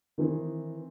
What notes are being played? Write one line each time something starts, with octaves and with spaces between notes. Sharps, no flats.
D#3 E3 C4